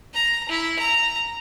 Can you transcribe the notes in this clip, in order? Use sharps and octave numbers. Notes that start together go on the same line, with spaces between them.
A#5
E4
A#5